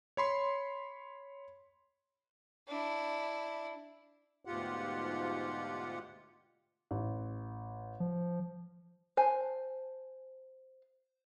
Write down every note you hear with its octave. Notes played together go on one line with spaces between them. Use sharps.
C#5 B5 C6
D4 E4
D2 G#2 B2 F4 G4 F#5
A1
F3
C5 G#5 A5